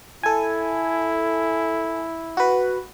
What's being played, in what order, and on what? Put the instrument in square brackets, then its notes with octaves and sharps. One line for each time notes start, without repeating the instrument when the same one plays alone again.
[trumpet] E4 [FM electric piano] A4 G#5
[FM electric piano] F#4 B4